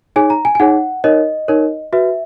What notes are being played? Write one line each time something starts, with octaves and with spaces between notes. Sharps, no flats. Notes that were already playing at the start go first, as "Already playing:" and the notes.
D#4 G#4 C#5 G#5
A#5
G#5
G#5
D#4 G#4 C#5 F#5
D#4 A#4 C#5 D#5
D#4 A#4 C#5
F#4 B4 E5